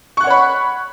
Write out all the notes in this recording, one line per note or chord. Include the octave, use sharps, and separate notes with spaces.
C#5 F#5 B5 C#6 F#6